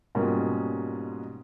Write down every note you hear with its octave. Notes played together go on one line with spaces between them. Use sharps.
G#2 B2 G3 A#3 C#4 F4